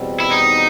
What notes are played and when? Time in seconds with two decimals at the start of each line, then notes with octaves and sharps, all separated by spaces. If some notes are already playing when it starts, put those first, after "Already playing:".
Already playing: E2 B2 G3 C4
0.20 E4
0.31 D#4